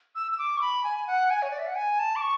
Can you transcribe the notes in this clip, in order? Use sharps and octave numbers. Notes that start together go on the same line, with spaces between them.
E6
E6
D6
C#6
B5
G#5
F#5
G#5
C#5
D5
E5
F#5
G#5
A5
D6
C#6